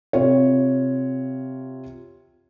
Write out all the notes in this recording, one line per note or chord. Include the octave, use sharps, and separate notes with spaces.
C3 F4 C#5